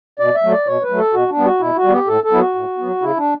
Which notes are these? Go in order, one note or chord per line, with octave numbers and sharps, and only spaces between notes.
B2 D5
E5
F#3 A3
D5
B2 C#5
B4
F#3 A3
A4
B2 F#4
D4
G3 B3
F#4
B2 E4
F#4
G3
B3 G4
A2 A4
A4
F#3 B3 E4
F#4
A2
F#3 B3
C#3 E4
D4